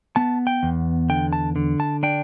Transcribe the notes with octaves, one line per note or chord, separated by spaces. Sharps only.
B3 A5
G5
E2
D3 G5
A5
D3
A5
D4 G5